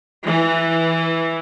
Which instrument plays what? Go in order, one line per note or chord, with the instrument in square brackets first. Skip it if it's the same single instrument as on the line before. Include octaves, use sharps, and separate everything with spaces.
[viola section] E3